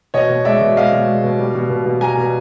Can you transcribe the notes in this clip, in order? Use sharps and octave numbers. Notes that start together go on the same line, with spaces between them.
B2 C#5 D#5
B2
G#3 D5 E5
B2
G#3 D#5 F5
B2
G#3
B2
G3
B2
B2
B2
G3 G#5 A#5
B2